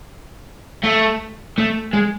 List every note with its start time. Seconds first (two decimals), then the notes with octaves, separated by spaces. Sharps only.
0.84 A3
1.58 A3
1.93 G#3